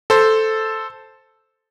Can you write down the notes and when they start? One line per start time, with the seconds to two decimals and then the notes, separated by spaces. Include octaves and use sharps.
0.10 A4 C5